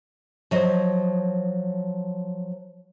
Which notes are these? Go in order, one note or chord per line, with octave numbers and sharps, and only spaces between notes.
F3 F#3 D#5